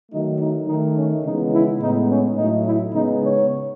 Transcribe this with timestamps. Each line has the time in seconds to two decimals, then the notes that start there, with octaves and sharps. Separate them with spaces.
0.12 D#3 F#3 A3 D#4
0.40 D#4
0.67 D#3 A3 D#4
0.95 C#4
1.23 C#3 E3 G#3 B3 D#4
1.52 E4
1.81 A2 G#3 B3 D#4
2.09 C#4
2.37 A2 F#3 A3 D#4
2.64 E4
2.93 C#3 G#3 B3 D#4
3.22 C#5